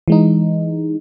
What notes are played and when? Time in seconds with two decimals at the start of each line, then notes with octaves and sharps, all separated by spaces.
0.08 E3 G#3 D#4